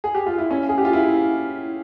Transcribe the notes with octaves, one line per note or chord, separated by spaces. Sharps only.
G#4
G4
F4
E4
C#4
G#4
G4
F4
E4